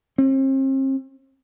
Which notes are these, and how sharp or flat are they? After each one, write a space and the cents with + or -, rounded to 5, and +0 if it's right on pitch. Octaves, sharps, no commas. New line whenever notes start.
C4 +40